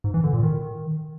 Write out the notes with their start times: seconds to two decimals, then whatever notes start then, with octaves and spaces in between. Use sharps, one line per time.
0.04 G#2
0.14 E3
0.24 D3
0.33 A#2
0.43 D#3